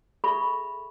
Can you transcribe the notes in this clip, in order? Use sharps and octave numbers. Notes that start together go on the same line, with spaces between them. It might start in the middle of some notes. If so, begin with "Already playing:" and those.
G#4 A4 D5 E5 B5 C#6